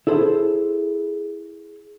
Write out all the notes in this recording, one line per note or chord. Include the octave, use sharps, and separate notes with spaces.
E4 G#4 A4 C5